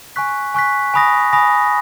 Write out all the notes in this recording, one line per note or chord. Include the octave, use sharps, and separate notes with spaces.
G#5 C#6 F#6 B6
G#5 C#6 F#6 B6
G#5 B5 D#6 A#6
G#5 B5 D#6 A#6